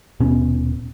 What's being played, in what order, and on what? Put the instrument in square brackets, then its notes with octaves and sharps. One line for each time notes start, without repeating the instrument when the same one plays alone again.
[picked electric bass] D#1 B2 B3 C#4